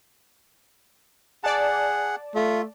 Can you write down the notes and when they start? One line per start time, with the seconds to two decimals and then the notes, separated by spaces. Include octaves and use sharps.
1.44 G#4 D5 F#5 A5
2.35 A3 F4